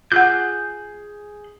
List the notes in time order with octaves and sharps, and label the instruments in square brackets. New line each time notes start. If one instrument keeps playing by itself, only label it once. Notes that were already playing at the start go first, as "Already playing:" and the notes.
[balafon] F4 F#5 [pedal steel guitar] G#4 F#6 G6